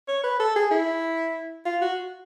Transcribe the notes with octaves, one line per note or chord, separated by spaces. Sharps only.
C#5
B4
A4
G#4
E4
F4
F#4